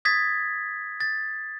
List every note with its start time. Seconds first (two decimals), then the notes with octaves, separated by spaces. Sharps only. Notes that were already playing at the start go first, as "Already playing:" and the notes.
0.05 D#6 G#6 A6 B6
1.01 A6